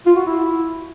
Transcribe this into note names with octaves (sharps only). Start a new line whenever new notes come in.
F4
F#4
E4